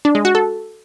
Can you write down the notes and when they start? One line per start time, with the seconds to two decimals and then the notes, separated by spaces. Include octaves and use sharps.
0.05 D4
0.15 G#3
0.25 F#4
0.35 A4